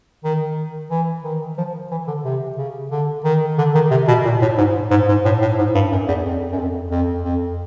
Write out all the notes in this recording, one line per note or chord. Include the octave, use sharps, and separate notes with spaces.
D#3
E3
D#3
F3
E3
D3
C3
C#3
D3
D#3
D3
D#3
C3
B2
A#2
A2
G#2
G#2
G#2
A2
A2
G#2
G2
F#2
E2
F2
F#2
F2
F2
F2